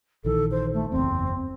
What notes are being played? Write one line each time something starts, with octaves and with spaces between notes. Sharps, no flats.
A#1 D#3 E3 A4
C5
A3
F#1 E2 C4